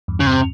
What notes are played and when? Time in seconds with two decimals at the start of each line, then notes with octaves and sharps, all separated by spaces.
0.08 E2 G2
0.20 C#3
0.27 C3